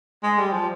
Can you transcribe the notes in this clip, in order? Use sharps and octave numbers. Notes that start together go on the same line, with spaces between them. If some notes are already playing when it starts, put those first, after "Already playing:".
G#3
G3
F3